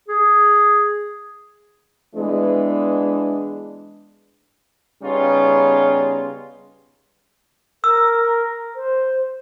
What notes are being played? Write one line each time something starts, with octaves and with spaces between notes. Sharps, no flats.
G#4
E3 G#3 B3 D4
C#3 G3 B3 C#4 D#4 F4
A#4 E6
C5